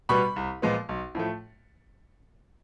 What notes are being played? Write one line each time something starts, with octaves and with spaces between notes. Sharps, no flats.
B2 G3 B3 B5 C#6
C2
A#2 F3 G#3 B3
B1
A2 F3 A3